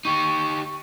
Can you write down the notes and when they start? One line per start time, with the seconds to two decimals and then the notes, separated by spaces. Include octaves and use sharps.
0.05 D#4 G4 C#6